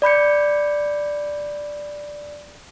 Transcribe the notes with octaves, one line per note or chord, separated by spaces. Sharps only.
D5 B5 G6 C#7